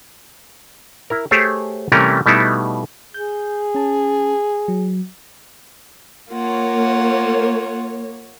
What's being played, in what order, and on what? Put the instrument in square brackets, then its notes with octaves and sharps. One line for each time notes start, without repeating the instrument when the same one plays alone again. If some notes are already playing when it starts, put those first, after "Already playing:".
[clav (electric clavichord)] E4 A#4
A3 G4 G#4 C5 C#5 A5
C3 E3 G3 A3 C#4 A#4
B2 G3 A3 B3 D#4 E4
[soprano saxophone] G#4 [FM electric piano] G6
[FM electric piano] C#4 A5
F#3
[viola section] A#3 C#5 [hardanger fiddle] F4 F#5